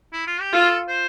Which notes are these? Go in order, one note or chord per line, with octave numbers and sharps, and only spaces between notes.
E4
F4
G4
F4 A4
C5